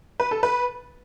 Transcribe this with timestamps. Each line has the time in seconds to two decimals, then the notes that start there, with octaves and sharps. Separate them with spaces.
0.20 B4
0.31 A4
0.43 B4